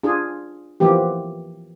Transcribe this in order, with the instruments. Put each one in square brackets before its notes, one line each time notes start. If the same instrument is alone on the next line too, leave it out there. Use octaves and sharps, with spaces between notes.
[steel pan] D4 F4 G#4
E3 F3 A#3 B3 G4